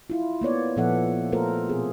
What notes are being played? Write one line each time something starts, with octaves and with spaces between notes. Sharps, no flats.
E4 F4
A#3 B3 C#5 D5
A#2 F3 B3 A4 E5 F#5
A3 A#3 F4 A4 A#4 C5
B2 C4 G#4